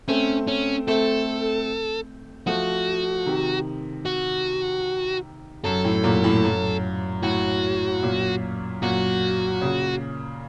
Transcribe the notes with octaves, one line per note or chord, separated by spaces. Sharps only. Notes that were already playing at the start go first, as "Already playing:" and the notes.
A3 C4 C#4
C#4
A3 C4 A4
F3 A3 F#4
C3 D#3
F#4
F#2 A4
A2
F#2 A#2
A2
F#2
A2 F#4
F#2 A#2
F#2 A#2 F#4
A#2 C#3